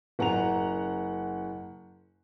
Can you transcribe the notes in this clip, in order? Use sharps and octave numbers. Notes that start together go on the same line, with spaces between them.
F#1 F#5 A#5 F7